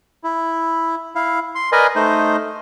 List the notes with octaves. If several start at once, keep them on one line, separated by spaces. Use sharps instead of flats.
E4
E4 F5
C6
A#4 B4 D5 D#5 G#5
A3 D#4 C5